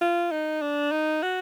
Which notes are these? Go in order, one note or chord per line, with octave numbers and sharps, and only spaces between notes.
F4
D#4
D4
D#4
F#4